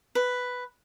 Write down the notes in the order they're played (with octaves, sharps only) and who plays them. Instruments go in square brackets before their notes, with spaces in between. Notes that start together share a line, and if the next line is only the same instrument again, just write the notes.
[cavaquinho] B4